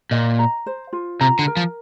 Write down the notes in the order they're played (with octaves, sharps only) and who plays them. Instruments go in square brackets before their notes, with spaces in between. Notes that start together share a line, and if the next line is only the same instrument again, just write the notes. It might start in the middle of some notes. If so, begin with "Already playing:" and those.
[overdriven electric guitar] A#2 [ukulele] D#5
[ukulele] A#5
C5
F4
[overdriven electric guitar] C3 [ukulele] A#5
[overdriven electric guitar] D3
[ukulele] A#4
[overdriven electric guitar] F3